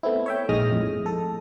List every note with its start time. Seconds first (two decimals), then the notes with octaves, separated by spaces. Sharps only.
0.03 A3 B3 C4 E4
0.26 C#5 E5 G5
0.49 A#1 G#2 G#3 D#6 F6 A#6
0.72 F2 A2
1.06 A4